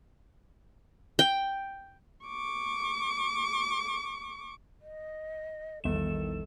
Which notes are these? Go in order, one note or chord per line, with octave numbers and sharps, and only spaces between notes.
G5
C#6 D6
D#5
A#1 E2 D#3 G3 A4 E7